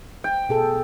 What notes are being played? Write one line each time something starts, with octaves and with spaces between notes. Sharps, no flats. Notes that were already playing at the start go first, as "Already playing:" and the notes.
G5
B2 G#4 A4